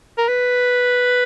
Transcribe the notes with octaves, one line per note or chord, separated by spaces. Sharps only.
A#4
B4